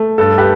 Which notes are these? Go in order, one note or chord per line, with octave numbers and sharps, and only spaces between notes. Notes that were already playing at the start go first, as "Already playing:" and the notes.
Already playing: A3
G2 A4
G4 B4